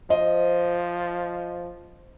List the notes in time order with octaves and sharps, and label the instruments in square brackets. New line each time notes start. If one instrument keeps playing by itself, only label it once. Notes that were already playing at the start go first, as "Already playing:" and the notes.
[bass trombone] F3 [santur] C5 [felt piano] D#5